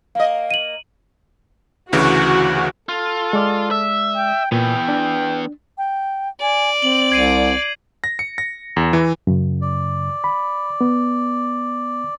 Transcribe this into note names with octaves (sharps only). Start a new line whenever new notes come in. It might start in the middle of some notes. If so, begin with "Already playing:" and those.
A#3 D#5 F5
D#7 F#7
D2 C#3 E3 F#4
F4 A4
G#3 D5 F6
E5
G5
A#2 E3 B3 G5
D4
G5
D5 G#5
C4 F#7
C2 G#6 C7 D#7
A#6
C#7
A#6
E2
E3
F#2 C#3
D5
B5
B3